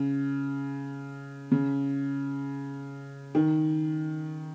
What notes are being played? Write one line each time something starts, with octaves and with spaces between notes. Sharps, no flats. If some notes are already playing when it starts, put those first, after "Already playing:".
Already playing: C#3
C#3
D#3